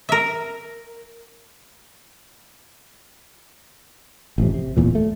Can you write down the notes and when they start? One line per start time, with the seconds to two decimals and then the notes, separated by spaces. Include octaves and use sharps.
0.09 A#4 E5
4.38 A1 F2 C3
4.54 C3
4.77 D1 E2 A#2
4.95 A3